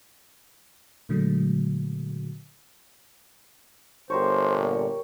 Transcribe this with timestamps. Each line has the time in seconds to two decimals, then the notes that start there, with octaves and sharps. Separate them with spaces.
1.09 A#2 D3 F#3 G#3 A3
4.10 G1 G4 A#4 C5 C#5
4.54 A#2